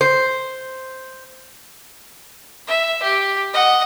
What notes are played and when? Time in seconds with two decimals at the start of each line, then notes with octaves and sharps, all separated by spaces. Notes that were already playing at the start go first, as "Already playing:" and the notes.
0.01 C5
2.67 E5
3.03 G4
3.53 D#5 F#5